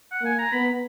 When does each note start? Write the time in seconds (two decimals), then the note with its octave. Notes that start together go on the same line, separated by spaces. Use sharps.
0.11 F#5
0.22 A#3 G#5
0.38 A#5
0.51 B3 B5